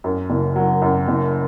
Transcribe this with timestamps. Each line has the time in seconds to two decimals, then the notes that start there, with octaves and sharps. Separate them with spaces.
0.04 F#2
0.30 F#1
0.56 F#3
0.82 F#2
1.08 F#1